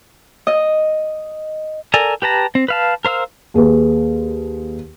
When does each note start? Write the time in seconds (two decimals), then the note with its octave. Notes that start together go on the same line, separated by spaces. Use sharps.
0.47 D#5
1.94 A4 A#4 D5 G#5 A#5
2.22 G4 B4 A5 A#5
2.55 C4
2.68 B4 F5 A5
3.05 A#4 C5 F5 E6
3.54 D#2 G#4 B4